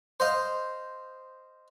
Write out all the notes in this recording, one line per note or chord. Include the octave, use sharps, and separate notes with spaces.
C5 D#5 F5